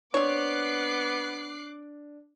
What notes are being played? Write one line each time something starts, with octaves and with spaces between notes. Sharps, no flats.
B3 C4 D4 C#5 D6 F#6 C7